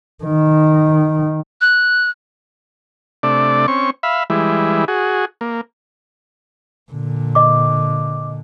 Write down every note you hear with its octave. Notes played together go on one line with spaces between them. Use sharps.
D#3
F#6
C3 A3 D4 D5
C4 C#4 C#6
E5 F5 B5
E3 G3 G#3 E4
F#4 G#4
A#3
A#2 D3
D#5 D6